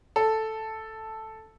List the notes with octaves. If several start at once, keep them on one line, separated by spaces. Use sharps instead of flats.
A4